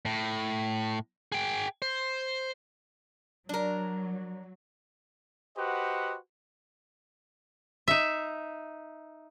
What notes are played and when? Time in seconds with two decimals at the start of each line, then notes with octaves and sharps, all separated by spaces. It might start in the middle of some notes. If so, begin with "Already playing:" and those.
0.06 A2
1.32 G#4 G5
1.82 C5
3.49 F#3 D4 A#4
5.56 F#4 G4 B4 C5 D#5 F#5
7.88 D#4 E5